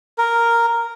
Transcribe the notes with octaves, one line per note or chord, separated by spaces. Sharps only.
A#4